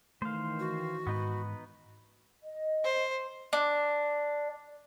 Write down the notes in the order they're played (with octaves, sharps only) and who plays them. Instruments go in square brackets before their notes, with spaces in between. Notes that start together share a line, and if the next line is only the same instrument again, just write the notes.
[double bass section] D#3 E3 [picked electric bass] A3 [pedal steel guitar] C5 F5
[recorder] F#4
[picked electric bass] G#2 [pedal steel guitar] B3 D#4 B4
[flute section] D#5
[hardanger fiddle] C5
[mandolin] D4